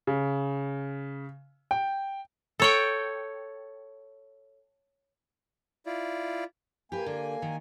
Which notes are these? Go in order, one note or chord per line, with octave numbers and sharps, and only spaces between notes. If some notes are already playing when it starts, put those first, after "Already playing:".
C#3
G5
A4 C#5 G5
E4 F4 D5
A#3 G4 B4 G#5
D3
D#3